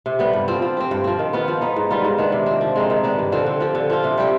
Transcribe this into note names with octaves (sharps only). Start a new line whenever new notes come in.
C3
G3 B3
G2
F3 C4
F3
C4 G4
G2
F3 C4
D#3
B3 F4
F3
B3 D#4
G#2
G3 B3 F4
G#2
D#3 B3 D4
C3
F3 C4
F3
G#3 C4 D#4
D#3
B3 D4 G4
G2
D3 F3 C4
D3
F3 C4 G4
D3
F3 C4 F4
C3
G3 C4 G4